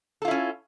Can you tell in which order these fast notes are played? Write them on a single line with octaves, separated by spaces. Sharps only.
A4 F4 E4 C#4